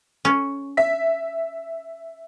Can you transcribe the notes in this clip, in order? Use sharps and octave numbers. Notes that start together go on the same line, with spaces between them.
C#4
E5 B6